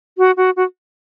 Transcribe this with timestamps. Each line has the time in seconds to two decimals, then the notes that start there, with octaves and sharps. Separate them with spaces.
0.18 F#4
0.37 F#4
0.56 F#4